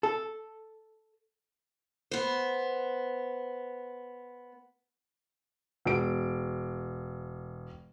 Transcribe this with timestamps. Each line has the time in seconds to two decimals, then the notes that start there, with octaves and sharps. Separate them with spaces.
0.03 A4
2.11 B3 C5
5.85 E1 D7